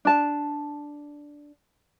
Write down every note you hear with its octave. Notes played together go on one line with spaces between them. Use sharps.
D4 A5